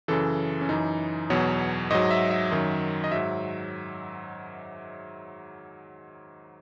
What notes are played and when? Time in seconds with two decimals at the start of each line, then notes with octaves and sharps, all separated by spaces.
0.08 F#2 C#3 E3 A4
0.61 C#4
0.69 F#2 E3 D#4
1.30 E2 B2 F#3 C#5
1.91 G#2 F#3 D#5
2.10 E5
2.31 E5
2.51 F#2 D#3 F#3
3.04 D#5
3.12 G#2 F#3 E5